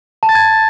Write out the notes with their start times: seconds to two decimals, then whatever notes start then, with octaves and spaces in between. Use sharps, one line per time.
0.23 A5
0.29 A6
0.35 G#6